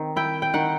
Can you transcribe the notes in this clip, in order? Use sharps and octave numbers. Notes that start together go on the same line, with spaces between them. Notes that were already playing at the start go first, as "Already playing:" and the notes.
Already playing: D#3 C4
E4 G5
G5
D#3 F#5